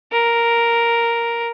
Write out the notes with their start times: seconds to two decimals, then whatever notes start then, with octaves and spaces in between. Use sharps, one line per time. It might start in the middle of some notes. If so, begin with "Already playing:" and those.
0.12 A#4